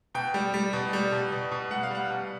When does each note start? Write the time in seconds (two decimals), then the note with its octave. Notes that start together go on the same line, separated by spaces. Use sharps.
0.15 B2 G5
0.34 G3
0.54 G3
0.73 B2
0.93 G3
1.12 B2
1.32 B2
1.52 B2
1.71 G3 F#5
1.83 F5
1.91 G3 F#5
2.10 B2